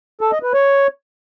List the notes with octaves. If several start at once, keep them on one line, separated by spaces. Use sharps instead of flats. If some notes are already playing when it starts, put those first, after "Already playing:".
A4
D#5
B4
C#5